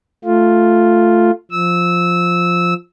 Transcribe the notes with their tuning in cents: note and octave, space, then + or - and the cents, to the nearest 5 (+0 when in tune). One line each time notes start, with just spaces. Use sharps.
A3 +0 F4 +0
F3 +0 E6 -15